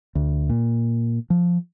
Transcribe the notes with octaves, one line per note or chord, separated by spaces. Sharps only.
D2
A#2
F3